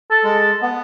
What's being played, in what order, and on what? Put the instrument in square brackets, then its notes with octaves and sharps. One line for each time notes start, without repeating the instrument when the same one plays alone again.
[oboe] A4
[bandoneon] G#3
B3